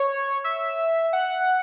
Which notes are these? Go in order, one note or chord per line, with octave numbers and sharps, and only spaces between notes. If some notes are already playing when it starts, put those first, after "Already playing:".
Already playing: C#5
E5
F#5